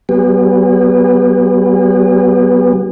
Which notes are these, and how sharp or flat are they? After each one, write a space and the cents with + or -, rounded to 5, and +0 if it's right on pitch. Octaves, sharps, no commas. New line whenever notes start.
F#3 +40 B3 +0 G#4 -45